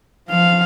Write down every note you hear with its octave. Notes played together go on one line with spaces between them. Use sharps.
F3 F5